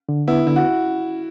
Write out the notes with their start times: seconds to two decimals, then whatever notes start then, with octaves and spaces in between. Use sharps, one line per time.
0.09 D3
0.28 B3 E4
0.47 D3 E4
0.56 F#4